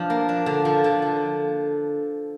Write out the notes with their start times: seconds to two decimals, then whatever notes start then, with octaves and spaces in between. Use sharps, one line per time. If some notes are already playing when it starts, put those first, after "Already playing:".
Already playing: F3 D4
0.10 A#3
0.29 D4
0.46 D3
0.65 F3
0.84 D3
1.02 F3